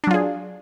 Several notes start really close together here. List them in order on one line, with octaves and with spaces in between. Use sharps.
D4 F#3 F4 G#4